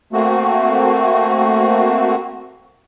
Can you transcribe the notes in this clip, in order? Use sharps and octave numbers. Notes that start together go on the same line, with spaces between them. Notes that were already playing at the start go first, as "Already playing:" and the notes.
A3 A#3 C4 F#4